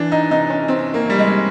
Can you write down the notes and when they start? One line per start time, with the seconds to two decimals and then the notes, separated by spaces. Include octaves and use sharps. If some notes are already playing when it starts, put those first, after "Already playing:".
Already playing: E3 D4
0.12 D#4
0.31 C3 D#4
0.50 C#4
0.68 C3 C4
0.94 A#3
1.06 C3 G3
1.19 G#3